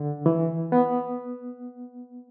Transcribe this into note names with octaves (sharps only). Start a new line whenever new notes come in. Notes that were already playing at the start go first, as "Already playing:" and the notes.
Already playing: D3
E3
B3